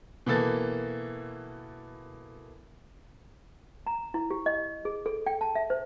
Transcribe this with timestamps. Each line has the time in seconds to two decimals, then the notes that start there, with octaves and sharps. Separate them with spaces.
0.26 B2 E3 A#3 A4 A6
3.87 A#5
4.14 E4
4.31 G4
4.46 D#5
4.85 G#4
5.06 A4
5.27 G5
5.41 A5
5.55 E5
5.70 C5